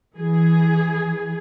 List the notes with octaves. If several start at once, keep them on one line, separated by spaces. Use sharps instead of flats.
E3 G#4